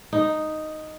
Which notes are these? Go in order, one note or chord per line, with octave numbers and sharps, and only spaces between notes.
D#4